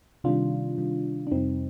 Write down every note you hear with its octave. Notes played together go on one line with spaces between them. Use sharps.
C3 D#3 G3 D4 F4
C3 D#3 G3
D4
F2 C3 G3 C4 D#4